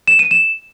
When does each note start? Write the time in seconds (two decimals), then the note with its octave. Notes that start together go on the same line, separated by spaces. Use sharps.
0.08 E7
0.19 D#7
0.31 E7